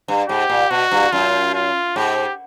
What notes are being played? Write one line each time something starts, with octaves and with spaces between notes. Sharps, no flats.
G2
G#2 G4
A#2
B2 F#4
G2
F#2 F4
F4
G#2 G4